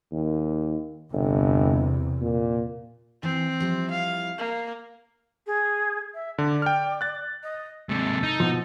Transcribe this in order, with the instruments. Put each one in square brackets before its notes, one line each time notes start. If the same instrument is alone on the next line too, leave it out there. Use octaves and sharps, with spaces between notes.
[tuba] D#2
[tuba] G1 [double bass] E2 C3
[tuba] A#2
[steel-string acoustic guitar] E3 [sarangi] C4
[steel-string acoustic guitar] F3 G3 E4
[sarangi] F5
A#3
[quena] G#4
E5
[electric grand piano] D3 [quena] D5
[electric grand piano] G5 F6
F#6 A6
[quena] D#5
[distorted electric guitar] G#2 C3 [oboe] A4
[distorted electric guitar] D#4
[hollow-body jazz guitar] B2 F3